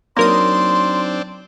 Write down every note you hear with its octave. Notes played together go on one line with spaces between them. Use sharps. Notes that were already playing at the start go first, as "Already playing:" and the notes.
F#3 A#3 C4 D4 D#4 A#4 C6 D#6